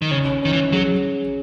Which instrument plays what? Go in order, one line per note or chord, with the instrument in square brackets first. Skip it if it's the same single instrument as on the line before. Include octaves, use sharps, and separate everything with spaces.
[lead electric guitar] D#3
[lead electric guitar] C#3 [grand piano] C#4
[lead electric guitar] D#3 [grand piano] C#4
[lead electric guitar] E3
[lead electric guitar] F#3 [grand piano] G#4